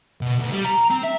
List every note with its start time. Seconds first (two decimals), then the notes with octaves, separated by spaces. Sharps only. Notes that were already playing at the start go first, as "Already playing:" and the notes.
0.21 B2
0.39 D2
0.53 G3
0.65 A#5
0.90 C4
1.03 E5